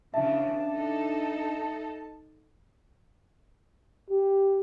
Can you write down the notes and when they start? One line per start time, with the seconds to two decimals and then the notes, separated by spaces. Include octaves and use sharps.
0.14 C#3 E3 D4 E5 A5
0.68 D#4 A4
4.11 G4